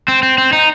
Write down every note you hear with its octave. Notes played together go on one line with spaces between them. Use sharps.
C4
C4
C4
D#4